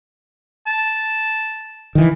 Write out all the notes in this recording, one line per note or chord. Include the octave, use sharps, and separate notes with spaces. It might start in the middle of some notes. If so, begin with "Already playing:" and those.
A5
D#3 E3